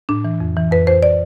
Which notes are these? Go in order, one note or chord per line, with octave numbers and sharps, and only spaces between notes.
A2 D4
E3
F2
E3
F2 B4
F2 C5
D5